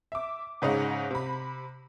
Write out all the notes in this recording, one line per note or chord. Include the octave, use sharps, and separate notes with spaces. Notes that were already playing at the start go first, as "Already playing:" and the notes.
E5 D6
G#2 C#3 C#4 D#4 F#5
C3 B5